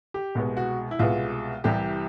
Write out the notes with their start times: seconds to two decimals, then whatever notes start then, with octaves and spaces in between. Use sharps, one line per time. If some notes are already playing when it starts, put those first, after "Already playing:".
0.14 G4
0.35 C2 B2 G#3 B3
0.57 F#4
0.91 E4
0.99 C2 B2 G#3 B3 F4
1.64 C2 C3 E3 G3 G4